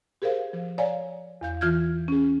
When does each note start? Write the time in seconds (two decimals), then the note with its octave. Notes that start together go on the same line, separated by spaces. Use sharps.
0.22 G4 G#4 A#4 C5 F5
0.53 F3
0.78 C#5 D5 F5 G#5 A#5
1.41 E2 F5 G6
1.61 E3 F4 F6 G6 G#6
2.08 C#4 G#4